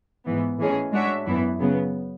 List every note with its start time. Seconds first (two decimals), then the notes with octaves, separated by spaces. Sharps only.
0.25 G#2 E3 B3
0.59 A2 E3 G#3 C#4 G#4
0.92 G#3 D4 F#4 C#5 E5
1.27 F#2 E3 B3 E4
1.59 C#3 F#3 B3